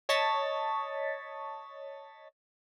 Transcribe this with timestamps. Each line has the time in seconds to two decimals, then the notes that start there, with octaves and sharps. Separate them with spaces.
0.09 C#5 D#5 A5 C#6 A6 B6